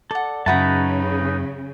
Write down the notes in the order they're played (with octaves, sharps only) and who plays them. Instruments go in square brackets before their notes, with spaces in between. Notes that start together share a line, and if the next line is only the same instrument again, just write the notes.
[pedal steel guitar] A4 [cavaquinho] D5 F#5
[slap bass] F#2 [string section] C#3 [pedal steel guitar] D#4 B4 A5 [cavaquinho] E4 F#4 A#5